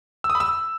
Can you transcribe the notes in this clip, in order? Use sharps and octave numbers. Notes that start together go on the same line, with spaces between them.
E6
D#6
B5
E6